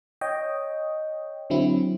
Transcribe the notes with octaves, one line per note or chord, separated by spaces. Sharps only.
C#5 D#5 G5
D3 F#3 C4 E4